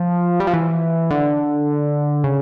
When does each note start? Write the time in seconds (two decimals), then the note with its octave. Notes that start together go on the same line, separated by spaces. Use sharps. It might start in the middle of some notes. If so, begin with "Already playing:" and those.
Already playing: F3
0.40 G3
0.47 F3
0.54 E3
1.11 D3
2.24 C#3